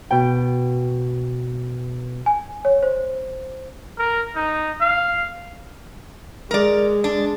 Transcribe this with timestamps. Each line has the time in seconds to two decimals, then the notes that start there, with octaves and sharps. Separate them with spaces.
0.11 B2 G5
2.26 G#5
2.65 C#5
2.83 C5
3.98 A#4
4.36 D#4
4.81 F5
6.51 G#3 A#4 D5
7.04 D4